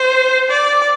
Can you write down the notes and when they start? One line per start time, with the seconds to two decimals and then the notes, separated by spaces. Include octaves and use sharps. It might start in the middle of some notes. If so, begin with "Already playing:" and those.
Already playing: C5
0.50 D5